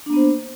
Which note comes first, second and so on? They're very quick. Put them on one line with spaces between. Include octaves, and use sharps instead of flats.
D4 A#3 B3 C5